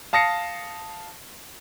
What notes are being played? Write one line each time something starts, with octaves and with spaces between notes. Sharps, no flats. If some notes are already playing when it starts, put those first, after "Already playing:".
F5 A5 D#6 A#6 C7 C#7